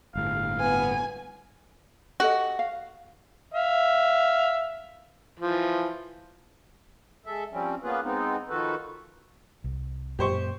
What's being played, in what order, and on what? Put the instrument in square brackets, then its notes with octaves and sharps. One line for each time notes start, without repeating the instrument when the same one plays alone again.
[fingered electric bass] G1 A2 [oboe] F5
[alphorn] B3 [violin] G#5
[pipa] F#4 [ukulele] G4 A4 D#5
[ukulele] F5
[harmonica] E5 F5
E3 F3
[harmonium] G#3 A4 E5
F3 G3 C4 C#4
A#3 B3 C#4 F4 G#4 B4
G#3 B3 C4 D#4
D#3 F3 F#4 A4 B4
[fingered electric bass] C2
[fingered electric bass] F#2 A#2 [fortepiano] G4 C5 C#6